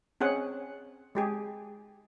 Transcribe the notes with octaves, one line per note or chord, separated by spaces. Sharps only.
C4 C#4 G#4 F#5
G#3 G4 G#4